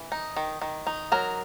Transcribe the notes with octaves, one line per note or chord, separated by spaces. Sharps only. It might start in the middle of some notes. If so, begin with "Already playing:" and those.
Already playing: E3
D#4
D#3
D#3
D#4
F#3 A#4